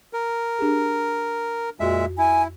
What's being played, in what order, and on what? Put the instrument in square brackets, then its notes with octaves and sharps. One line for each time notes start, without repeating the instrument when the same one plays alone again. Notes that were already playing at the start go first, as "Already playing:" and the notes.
[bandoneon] A#4
[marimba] D4 G4 G#4
[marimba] F2 F#4 [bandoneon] A#2 G#3 E5
[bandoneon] E4 [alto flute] G#5